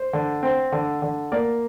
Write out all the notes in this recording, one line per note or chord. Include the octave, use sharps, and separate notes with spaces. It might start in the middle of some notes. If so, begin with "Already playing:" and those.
Already playing: C5
D3
C4
D3
D3
A#3 D5